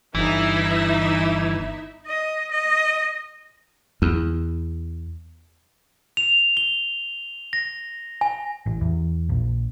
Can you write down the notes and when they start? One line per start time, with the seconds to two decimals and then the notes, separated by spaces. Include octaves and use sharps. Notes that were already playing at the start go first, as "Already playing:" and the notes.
0.15 G1 E3 D#4 E4 E5
2.06 D#5
2.52 D#5
4.02 E2
6.17 F7
6.57 G7
7.53 A#6
8.21 G#5
8.66 A1
8.81 E2
9.29 A#1